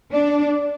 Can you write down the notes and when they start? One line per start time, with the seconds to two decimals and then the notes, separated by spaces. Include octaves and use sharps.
0.12 D4